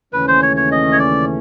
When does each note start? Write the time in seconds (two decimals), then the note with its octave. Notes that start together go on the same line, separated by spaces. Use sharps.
0.13 D#2 C#3 E3 A3 C#4 B4
0.28 C5
0.43 C#5
0.57 C#5
0.71 D#5
0.92 C#5
0.99 D5